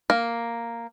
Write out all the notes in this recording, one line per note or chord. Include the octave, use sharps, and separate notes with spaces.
A#3